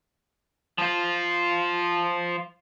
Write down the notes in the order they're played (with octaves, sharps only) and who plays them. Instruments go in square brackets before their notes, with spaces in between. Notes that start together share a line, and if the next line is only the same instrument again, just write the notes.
[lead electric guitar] F3 F4